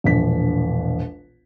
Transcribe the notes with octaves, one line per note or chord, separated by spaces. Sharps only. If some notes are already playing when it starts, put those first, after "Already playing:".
E1 A#1 B6